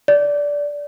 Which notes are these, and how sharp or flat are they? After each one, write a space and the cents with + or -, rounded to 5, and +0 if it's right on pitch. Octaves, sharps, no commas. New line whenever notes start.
D5 -15